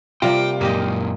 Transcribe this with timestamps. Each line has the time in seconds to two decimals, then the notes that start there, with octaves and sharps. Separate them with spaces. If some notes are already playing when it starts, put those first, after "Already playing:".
0.22 C3 G3 A#3 F4 G5
0.61 F#2 A#2 A#3 G4 D#5